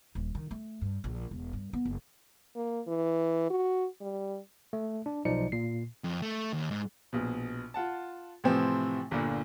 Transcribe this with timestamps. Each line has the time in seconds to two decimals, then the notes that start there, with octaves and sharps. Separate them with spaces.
0.15 D#1
0.35 D#3
0.51 A3
0.81 G2
1.04 A#1
1.31 E1
1.53 G2
1.73 B3
1.85 F#1
2.56 A#3
2.88 E3
3.50 F#4
4.01 G3
4.73 A3
5.06 D4
5.25 B1 F3 D#4 D5 C#7
5.52 A#2 C7
6.04 F2
6.22 A3
6.53 D#2
6.71 G#2
7.13 A#1 B2
7.74 F4 F#5 A5
8.44 A2 C3 E3 F3 C4
9.11 G1 A#2 D3